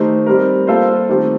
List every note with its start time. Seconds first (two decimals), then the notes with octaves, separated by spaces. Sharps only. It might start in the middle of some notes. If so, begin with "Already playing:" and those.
Already playing: D#3 A3 D#4 G4 C5
0.26 G3 C4 G4 A#4
0.67 G3 A#3 F4 A4 C5
1.09 D#3 A3 C4 G4